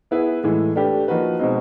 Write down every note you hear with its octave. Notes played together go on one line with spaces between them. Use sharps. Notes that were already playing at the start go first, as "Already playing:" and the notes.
B3 E4 G#4 B4
A2 E3 G#3
A3 D4 G4 B4
F3 A#3 D#4 F#4 B4
B2 G#3 C4 D#4